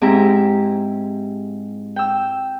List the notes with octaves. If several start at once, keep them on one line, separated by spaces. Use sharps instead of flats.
G#2 C4 E4 G4 A#5
G5 E6